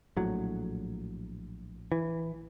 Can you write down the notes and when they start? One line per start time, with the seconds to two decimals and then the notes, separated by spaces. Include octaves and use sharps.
0.17 A#1 A2 F#3
1.92 E3